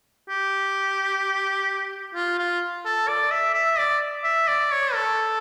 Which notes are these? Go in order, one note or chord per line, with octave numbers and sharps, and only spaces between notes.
G4
F4
F4
A4
D5
E5
E5
D5
E5
D5
C#5
A4